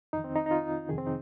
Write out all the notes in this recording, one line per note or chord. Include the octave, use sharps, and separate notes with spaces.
F2 D#3 D#4
C4
D#4
D#4
F4
F2 C3 D#3 G#4
C4
D#4